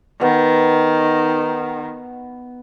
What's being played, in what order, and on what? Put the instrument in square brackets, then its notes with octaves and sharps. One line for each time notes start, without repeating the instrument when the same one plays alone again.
[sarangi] D#3 [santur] B3